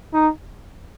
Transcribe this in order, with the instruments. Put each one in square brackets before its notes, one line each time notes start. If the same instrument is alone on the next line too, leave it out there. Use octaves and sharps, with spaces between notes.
[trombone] D#4